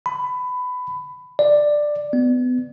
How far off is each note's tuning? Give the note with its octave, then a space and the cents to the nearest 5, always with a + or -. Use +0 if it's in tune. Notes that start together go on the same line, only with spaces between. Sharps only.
B5 +20
D5 +10
B3 +25